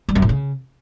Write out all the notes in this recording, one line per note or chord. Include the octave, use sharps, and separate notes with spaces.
G3
F#2
A2
C#3